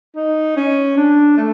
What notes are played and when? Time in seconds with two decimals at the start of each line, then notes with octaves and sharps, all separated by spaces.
0.16 D#4
0.57 C#4
0.97 D4
1.37 A3